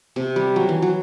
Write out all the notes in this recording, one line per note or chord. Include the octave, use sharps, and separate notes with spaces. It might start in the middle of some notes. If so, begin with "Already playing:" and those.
C3
G3
F#3
E3
F#3